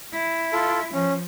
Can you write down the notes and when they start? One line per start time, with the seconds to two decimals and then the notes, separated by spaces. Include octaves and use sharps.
0.12 E4
0.53 F4 A4
0.94 F3 C#4